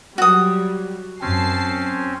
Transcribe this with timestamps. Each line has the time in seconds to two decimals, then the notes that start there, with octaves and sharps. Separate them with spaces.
0.18 F#3 G3 F#4 D#6
1.21 F#2 C4 C#4 A5 C7